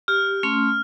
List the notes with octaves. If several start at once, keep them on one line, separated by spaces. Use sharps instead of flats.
G4 F6
A3 C#4 C6